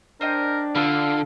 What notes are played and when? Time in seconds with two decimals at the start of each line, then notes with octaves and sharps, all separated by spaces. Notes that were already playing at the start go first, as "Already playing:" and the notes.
0.21 D4 A#4 C5 D#5 G5
0.75 D3 F4 A4 B4 F5